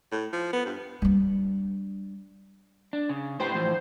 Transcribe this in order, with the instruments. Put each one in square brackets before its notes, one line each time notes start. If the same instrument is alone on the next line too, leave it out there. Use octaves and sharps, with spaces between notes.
[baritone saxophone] A2
F3
B3
G2
[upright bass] G3 D4
[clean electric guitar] D4
C#3
[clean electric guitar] A2 G4 B4 [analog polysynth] C5
[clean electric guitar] A2 E3 F3